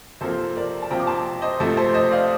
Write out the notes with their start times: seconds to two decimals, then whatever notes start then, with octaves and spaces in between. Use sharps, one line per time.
0.21 C3 F3 A#3 A4 C5
0.56 A#4 D5
0.82 A5
0.90 C3 F3 A#3 G5 A#5
1.00 D6
1.07 A5 C6
1.42 C5 D#5
1.60 C3 F3 A3 A4
1.77 A4 C5
1.94 C5 D#5
2.11 D5 F5